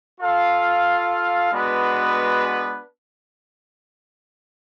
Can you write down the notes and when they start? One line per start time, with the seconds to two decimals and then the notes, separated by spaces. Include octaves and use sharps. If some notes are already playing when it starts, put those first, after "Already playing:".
0.20 F4 A4 F5
1.52 G#3 B3 D4 F#4 B4